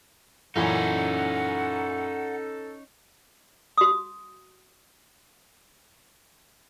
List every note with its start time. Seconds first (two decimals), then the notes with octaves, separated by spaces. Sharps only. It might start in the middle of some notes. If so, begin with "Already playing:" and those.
0.56 F#2 A#2 E3 C#4 D#4 A4 F#5
3.78 F#4 D#6